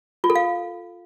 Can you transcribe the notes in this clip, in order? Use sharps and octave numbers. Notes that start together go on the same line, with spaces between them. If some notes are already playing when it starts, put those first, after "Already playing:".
F4
A4
F5